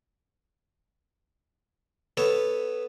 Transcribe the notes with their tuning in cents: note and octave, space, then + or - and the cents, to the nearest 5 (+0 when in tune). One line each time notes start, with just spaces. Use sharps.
B3 +0 A4 -5 C#5 +0